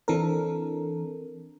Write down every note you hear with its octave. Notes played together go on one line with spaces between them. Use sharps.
E3 C4 D4 A4 A#4